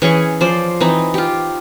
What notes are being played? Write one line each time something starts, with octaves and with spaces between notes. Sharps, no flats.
E3 C#4 G#4 C#6
F3 C5 D5
E3 C4 D#4
F4 G4